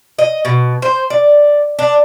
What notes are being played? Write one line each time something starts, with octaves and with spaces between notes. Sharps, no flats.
D#5
B2
C5
D5
D4